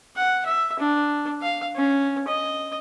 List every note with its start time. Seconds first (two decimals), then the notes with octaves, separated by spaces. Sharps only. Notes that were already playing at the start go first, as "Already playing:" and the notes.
0.16 F#5
0.45 E5
0.79 D4
1.41 F5
1.75 C#4
2.28 D#5